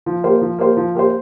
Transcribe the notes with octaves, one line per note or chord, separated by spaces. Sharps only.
F3
A#3 G4 C5
F3
A#3 G4 C5
F3
A#3 G4 C5